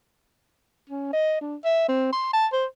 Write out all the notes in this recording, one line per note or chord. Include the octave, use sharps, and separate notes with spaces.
C#4
D#5
D4
E5
C4
C6
A5
C5